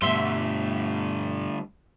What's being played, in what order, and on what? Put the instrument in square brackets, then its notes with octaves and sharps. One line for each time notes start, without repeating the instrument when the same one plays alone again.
[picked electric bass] G2 B2 [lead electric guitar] D3 G3 [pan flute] A3 [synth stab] E5 C6